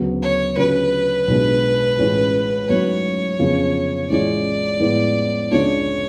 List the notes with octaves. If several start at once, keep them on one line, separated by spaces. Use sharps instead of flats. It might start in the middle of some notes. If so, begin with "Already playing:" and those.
Already playing: D2 C#3 F#3 B3
C#5
D2 C#3 F#3 C#4 F4 B4
B1 B2 G#3 D4 F4
A1 A2 G#3 C#4 F4
G#2 F#3 A3 C#4 C#5
F2 C#3 F3 B3
A1 A2 G#3 C#4 F4 D5
A2 F3 G#3 B3
C#2 C#3 G#3 D4 F4 C#5